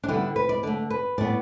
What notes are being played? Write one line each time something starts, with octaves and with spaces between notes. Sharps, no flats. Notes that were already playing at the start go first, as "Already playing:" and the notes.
D4
D3 G3 B3 E4
B4
D5
D3 A3 D5
B4
A2 G3 B3 D5